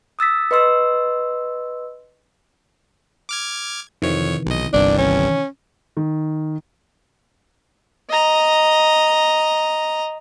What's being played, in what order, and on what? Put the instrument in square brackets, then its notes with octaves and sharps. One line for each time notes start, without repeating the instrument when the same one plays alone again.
[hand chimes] D#6 E6 A6 B6
B4 D#5 C6 E6
[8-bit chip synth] D6 F6 G#6
[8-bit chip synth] F2 C#5 [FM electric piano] C3 D#3 E3
[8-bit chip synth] B1 D#5
[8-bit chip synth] G1 C2 G2 [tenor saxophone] D4
[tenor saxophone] C#4
[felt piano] D#3
[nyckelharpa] D#5 A#5